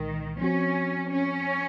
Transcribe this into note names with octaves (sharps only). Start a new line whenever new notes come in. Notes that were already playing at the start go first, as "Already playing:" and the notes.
Already playing: C2 A#2 D#3 G#3
F3 C4 C#4 F#4
C#4